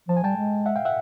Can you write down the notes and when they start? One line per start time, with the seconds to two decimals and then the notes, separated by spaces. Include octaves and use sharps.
0.09 F3 A5
0.17 G#5
0.23 G3 G5 A5
0.37 G#3
0.66 E5 F#5
0.76 F5 G5
0.85 E5 F#5